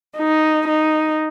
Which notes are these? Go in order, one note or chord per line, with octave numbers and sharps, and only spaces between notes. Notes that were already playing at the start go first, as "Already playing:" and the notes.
D#4
D#4